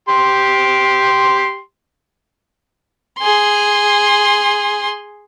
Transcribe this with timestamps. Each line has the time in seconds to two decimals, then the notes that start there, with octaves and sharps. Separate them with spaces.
0.09 G4 C6
3.19 G#4 C6